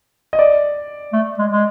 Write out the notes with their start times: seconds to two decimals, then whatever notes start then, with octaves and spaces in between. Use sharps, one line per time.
0.33 D#5
0.39 D5
1.13 A3
1.39 G#3
1.52 G#3